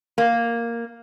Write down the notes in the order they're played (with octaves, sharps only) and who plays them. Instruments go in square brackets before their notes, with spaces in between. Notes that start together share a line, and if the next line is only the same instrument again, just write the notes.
[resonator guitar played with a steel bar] A#3